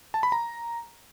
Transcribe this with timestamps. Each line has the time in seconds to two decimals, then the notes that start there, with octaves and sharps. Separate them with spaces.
0.14 A5
0.23 B5
0.32 A#5